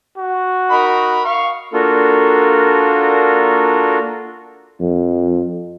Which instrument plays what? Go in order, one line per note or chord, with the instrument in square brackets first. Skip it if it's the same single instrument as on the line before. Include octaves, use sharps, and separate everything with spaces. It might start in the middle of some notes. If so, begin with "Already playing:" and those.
[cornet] F#4
[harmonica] D#4 A#4 B5
F5 C#6
[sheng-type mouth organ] A#3 D4 F4 F#4 A4 A#4
[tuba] F2